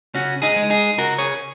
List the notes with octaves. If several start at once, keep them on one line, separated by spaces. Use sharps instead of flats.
C#3 C#4 F#4
D#4 G#4
G#3
D#4 G#4
C#3 F#4 A#4
G#4 C#5